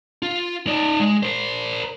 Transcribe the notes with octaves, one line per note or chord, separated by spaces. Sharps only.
F4
D#4 D5
G#3
A#4 C5